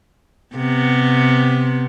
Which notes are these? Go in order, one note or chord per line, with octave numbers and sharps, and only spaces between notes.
C3 B3